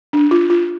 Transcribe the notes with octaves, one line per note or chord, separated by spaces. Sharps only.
D4
F4
F4